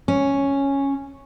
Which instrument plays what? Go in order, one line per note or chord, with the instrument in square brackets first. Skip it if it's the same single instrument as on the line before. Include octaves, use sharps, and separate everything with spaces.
[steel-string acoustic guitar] C#4